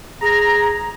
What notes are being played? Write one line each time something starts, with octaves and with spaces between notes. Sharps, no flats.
G#4 A#5